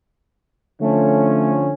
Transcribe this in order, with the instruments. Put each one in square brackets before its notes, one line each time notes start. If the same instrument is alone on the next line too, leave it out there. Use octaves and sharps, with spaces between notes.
[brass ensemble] D3 F3 C#4 [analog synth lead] A3